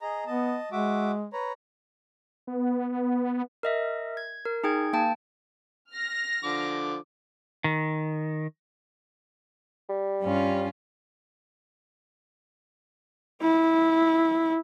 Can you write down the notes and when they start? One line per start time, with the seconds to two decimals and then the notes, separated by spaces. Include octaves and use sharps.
0.01 G#4 D#5 A#5
0.27 B3 D#5 A5
0.72 G#3 F#4 E5 D6
1.33 B4 C#5 A#5
2.47 B3
3.63 A#4 D#5 E5
4.17 G#6
4.45 A#4
4.64 D#4 G#4 G5 G#6
4.93 A#3 G5 A5
5.91 F6 A#6
6.44 D3 F3 D6
7.64 D#3
9.89 G3
10.22 G2 C#4 F4
13.42 E4